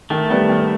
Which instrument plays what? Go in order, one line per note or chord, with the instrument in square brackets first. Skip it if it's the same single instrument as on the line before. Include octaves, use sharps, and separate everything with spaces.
[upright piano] D#3 [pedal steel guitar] A3
[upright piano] G3 B3
D#3